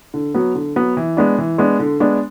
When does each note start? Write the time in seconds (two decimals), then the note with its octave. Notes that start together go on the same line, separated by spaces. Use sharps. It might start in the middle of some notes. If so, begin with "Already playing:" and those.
0.14 D3
0.34 F#3 B3
0.55 D3
0.76 F#3 B3
0.97 E3
1.17 G#3 B3 D4
1.38 E3
1.58 G#3 B3 D4
1.79 D3
2.00 G#3 B3 D4